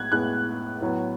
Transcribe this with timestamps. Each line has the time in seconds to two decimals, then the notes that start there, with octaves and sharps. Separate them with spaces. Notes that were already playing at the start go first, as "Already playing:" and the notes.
Already playing: A2 G#3 B3 F#6 G#6
0.12 A2 G#3 B3 F#6
0.81 A2 F#3 B3